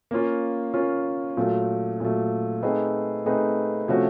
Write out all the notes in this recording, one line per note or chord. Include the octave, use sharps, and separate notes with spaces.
A#3 C#4 F4
A#3 C#4 F4
A#2 F#3 A3
A#2 F#3 A3
A3 C4 D#4 G#4 B4
A3 C4 D#4 G#4 B4
C3 F3 A3 C#4 F#4